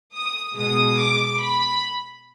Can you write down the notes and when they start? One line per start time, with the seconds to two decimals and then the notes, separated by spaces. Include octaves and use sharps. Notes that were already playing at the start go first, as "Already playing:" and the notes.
0.14 D#6
0.56 B2 G#3 D#6
0.98 D6
1.40 B5